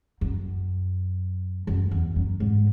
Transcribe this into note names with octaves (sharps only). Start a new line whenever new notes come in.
F#2
F#2
E2
F#2
G#2